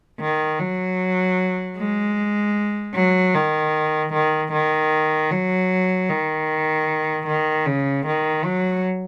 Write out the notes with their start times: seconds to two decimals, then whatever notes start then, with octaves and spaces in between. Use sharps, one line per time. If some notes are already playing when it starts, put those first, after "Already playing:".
0.20 D#3
0.60 F#3
1.77 G#3
2.94 F#3
3.34 D#3
4.13 D#3
4.52 D#3
5.31 F#3
6.10 D#3
7.27 D#3
7.66 C#3
8.06 D#3
8.44 F#3